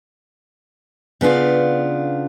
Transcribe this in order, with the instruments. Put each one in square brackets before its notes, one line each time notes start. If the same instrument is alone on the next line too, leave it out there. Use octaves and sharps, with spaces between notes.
[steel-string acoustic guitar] C#3 B3 D4 F4